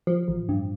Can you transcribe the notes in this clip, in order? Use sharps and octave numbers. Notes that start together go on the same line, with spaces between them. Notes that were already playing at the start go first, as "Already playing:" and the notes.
F3
A1
G2